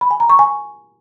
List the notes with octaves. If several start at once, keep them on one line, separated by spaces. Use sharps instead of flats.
B5
G#5
A#5
C#6
G#5